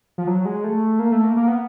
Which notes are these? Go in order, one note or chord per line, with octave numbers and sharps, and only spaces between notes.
F3
F#3
G#3
A3
A#3
A3
A#3
A#3
B3